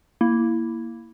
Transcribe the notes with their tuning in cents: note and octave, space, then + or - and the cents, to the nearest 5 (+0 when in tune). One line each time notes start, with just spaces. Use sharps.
A#3 +0 E4 +0